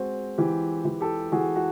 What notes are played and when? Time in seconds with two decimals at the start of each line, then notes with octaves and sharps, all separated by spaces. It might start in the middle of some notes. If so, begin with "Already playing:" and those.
Already playing: G#3 C4 F#4
0.38 E3 G4
0.85 E3
1.01 G4 A4
1.32 E3 F#4 G#4
1.56 F#4